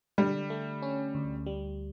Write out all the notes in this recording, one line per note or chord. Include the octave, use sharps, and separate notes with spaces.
D3 G3
A3
C#4
D2
G3